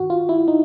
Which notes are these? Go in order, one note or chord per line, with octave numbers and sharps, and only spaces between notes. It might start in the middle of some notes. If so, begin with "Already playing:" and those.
Already playing: G2 D#3 F#4
F4
E4
D#4